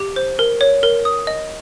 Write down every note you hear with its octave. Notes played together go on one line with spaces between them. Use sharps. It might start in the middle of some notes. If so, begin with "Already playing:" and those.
Already playing: G4
C5
A#4
C#5
A#4
D#6
D#5